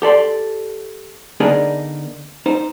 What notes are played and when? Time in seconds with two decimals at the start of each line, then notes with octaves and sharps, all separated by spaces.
0.02 G4 A4 D5 C6
1.40 D3 B3 D4 D#4 G#4 A#4
2.46 D#4 C5